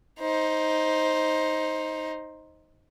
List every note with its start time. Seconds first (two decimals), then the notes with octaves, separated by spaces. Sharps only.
0.20 D#4 C5